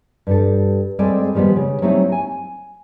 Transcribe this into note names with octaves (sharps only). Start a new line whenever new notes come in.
G2 G3 A4
G3 G#3 C4 G#4 A4 D5
D#3 F3 G3 G#3 B3
C#3
F#3 G3 A3 C4 D#4 E4
G#5